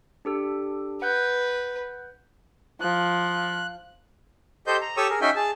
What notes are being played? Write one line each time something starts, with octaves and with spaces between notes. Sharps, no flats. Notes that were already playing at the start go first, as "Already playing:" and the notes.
D4 G4 A4
B4 F#5 F#6 G6
F3 F#6
G4 A4 C5 D#5 C6 G6
A#5
G4 A4 C#5 C#6 D#6 E6
G#4 A#4
C#4 D#4 F#4 E5 G5 G#5
G#4 A5